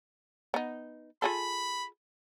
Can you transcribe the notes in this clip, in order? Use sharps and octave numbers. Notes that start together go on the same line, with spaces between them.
B3 D#4
F4 G#4 A4 B5